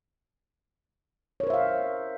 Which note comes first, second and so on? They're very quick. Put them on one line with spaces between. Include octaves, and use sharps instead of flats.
C#5 A#4 C5 E5 F5